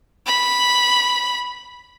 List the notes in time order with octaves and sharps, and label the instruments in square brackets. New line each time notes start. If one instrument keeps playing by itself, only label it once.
[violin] B5